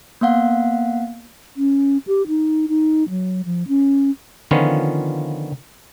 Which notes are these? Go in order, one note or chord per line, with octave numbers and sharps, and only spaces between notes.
A#3 B3 F5 F#5
C#4
G4
D#4
D#4
F#3
F3
C#4
D3 D#3 F3 B3 C#4 F4